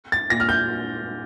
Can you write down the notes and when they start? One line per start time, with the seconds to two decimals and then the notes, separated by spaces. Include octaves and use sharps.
0.12 A6
0.30 A#2 A#6
0.40 F6
0.49 G6